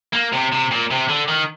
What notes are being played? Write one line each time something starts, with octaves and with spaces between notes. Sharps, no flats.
A#3
C3
C3
A#2
C3
D3
D#3